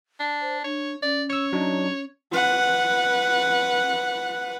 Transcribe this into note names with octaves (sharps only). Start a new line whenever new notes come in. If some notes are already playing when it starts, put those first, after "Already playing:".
D4
C5
D4 C#5
C#4 D5
C#5 C#6 E6
F#3 D4 D#4
B4 F#5